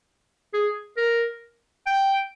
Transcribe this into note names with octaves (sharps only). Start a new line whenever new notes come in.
G#4
A#4
G5